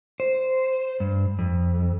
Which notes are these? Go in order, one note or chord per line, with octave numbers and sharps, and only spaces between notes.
C5
G2
F2